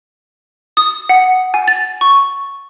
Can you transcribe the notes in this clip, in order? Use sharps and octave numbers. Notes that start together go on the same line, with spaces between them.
D#6
F#5
G#5
A6
C#6